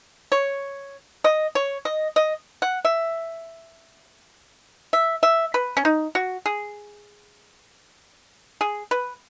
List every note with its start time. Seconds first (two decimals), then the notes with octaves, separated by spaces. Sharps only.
0.32 C#5
1.24 D#5
1.55 C#5
1.85 D#5
2.16 D#5
2.62 F#5
2.85 E5
4.93 E5
5.23 E5
5.54 B4
5.77 C#4
5.85 D#4
6.15 F#4
6.46 G#4
8.61 G#4
8.91 B4